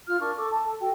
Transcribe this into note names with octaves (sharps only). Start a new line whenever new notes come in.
F4 F6
D4 A#4 C#6
A4 C#6 D6
A5
A4
F#4 A4 G5